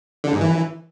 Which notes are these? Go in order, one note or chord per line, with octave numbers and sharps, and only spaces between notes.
D3
G#2
E3